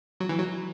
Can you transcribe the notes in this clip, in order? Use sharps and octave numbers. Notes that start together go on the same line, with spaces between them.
F#3
E3
F#3